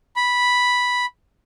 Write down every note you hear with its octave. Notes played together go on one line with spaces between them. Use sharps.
B5